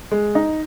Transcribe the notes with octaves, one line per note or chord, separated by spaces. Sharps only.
G#3
D#4